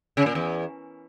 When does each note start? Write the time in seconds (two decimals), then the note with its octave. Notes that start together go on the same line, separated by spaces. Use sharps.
0.17 C#3
0.26 A#2
0.35 E2